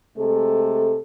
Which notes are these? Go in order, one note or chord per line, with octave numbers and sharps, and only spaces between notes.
C3 G#3 A3 A4